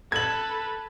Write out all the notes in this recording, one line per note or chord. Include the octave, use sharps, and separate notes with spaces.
A4 B4 G#6 F#7